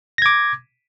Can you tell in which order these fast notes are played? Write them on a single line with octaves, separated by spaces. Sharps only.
A#6 G#6 D6